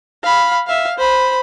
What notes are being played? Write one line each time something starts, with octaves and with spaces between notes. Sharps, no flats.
F5 B5
E5 F5
C5 B5